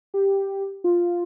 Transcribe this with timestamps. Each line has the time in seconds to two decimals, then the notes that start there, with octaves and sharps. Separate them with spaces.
0.14 G4
0.84 F4